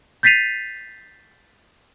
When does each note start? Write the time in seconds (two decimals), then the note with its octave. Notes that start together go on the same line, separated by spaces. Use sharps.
0.23 G6 A6 B6 C7 D#7 F7